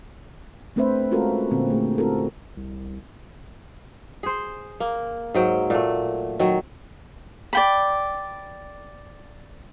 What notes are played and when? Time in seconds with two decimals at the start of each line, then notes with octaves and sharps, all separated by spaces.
0.76 A3 C4 D4 B4 C5 E5
1.11 G#3 C#4 F4 F#4 A4 A#4
1.51 A#2 D3 C4
1.70 A3 G#4
1.98 C4 E4 F#4 A4 A#4
2.57 C2
4.23 G#4 C5
4.80 A#3
5.34 G#2 F#3 G5
5.70 A#2 A3
6.39 D#3 F#3
7.53 D5 G5 B5